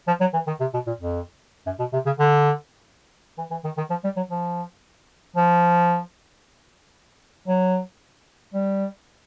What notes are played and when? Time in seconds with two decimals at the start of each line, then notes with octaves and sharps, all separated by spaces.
0.08 F3
0.20 F#3
0.34 E3
0.47 D#3
0.60 C3
0.74 B2
0.87 A#2
1.00 F2
1.66 F#2
1.79 B2
1.93 C3
2.06 C#3
2.19 D3
3.38 E3
3.51 E3
3.65 D#3
3.77 D#3
3.90 F3
4.04 G3
4.17 F#3
4.31 F3
5.36 F3
7.48 F#3
8.54 G3